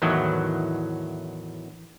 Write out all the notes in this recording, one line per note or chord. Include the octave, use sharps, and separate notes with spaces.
E2 A2 D#3 E3 F#3